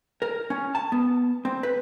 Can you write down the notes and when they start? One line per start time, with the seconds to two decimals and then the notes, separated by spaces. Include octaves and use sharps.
0.22 A#4
0.50 C#4
0.75 A5
0.92 B3
1.45 C4
1.63 B4